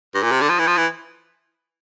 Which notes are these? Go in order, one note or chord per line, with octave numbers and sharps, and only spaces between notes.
G2
A#2
C3
D3
F3
E3
F3
E3